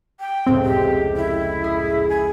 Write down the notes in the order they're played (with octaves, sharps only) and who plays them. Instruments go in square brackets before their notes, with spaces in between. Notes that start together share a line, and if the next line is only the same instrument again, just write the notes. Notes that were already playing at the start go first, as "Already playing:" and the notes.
[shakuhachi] G5
[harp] F1 C#2 A2 [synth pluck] C4
[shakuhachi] G4
E4
[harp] G#4 D#6
[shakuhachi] G#5